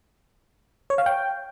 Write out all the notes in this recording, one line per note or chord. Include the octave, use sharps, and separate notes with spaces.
C#5
F5
G5